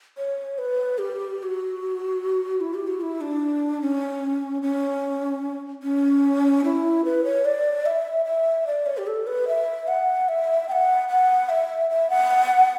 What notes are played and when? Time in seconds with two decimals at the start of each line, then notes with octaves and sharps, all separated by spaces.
0.17 C#5
0.58 B4
0.98 G4
1.38 G4
1.43 F#4
2.61 E4
2.74 G4
2.87 F#4
3.01 E4
3.21 D4
3.81 C#4
4.62 C#4
5.83 C#4
6.64 E4
7.05 B4
7.24 C#5
7.45 D5
7.86 E5
8.25 E5
8.67 D5
8.86 C#5
8.97 G4
9.07 A4
9.27 B4
9.48 E5
9.87 F#5
10.29 E5
10.68 G5
10.72 F#5
11.08 F#5
11.49 E5
11.90 E5
12.10 F#5